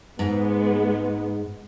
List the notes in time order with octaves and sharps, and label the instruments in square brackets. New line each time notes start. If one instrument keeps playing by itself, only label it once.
[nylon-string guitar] G#2 [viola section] G#3 B3